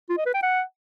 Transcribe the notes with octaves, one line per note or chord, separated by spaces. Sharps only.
F4
D#5
B4
G5
F#5